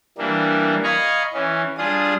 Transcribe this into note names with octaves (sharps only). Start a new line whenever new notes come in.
E3 G3 A#3 D4
D#5 F5 G#5 A#5 B5 C#6
E3 C#4
G3 D4 F4 G#4 D#6